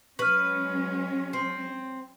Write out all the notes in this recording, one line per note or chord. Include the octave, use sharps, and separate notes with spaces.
F#3 G#3 C#4 B4 C#6 F6
C4